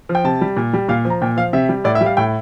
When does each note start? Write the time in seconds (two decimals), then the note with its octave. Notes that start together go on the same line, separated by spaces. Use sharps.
0.09 F3
0.15 G5
0.24 C3 A5
0.41 G3
0.56 A#2
0.73 G3
0.88 A#2 F5
1.05 F3
1.10 A#5
1.22 A#2 G5
1.37 F3 F5
1.53 C3 E5
1.69 G3
1.84 A2 D5
1.95 E5
2.01 G3
2.06 F5
2.17 A2 G5